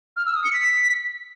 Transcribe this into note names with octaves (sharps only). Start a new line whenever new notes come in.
F6
E6
D#6
C#7
B6